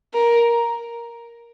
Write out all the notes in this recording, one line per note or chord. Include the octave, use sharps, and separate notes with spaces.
A#4